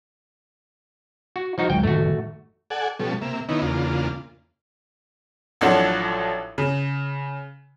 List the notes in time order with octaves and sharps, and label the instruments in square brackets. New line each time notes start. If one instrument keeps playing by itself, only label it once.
[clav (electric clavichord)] F#4
F3 D#4 F#4
[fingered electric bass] D2 F#3 G#3 [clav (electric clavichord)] G5
[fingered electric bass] F#2 A2 D#3 [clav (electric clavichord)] A3 F#4
[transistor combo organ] A4 D5 F#5 G#5
B2 F3 G3 C#4 A4
C3 A#3 E5
D#3 B3 C#4 D#4 E4
E2 C#3 A#3 D4 F4
[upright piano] A1 F3 F#3 D4 A4 F#5
C#3